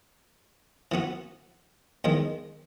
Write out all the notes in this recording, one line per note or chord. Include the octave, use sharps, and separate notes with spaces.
E3 B3 F#4
E2 D#3 G#3